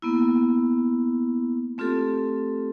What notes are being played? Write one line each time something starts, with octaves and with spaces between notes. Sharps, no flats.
A#3 B3 E4
A3 C4 F4 G4 A4